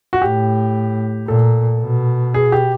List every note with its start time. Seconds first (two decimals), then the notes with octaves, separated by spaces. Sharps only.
0.13 F#4
0.22 A2 G4
1.28 A#2 A4
1.81 B2
2.34 G#4
2.52 G4